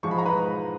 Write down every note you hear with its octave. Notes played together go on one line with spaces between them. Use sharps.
G#2 F3 G#3 C#6
B5
A#5
B4 B5